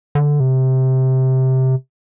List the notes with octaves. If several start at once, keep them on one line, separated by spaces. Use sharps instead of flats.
D3
C3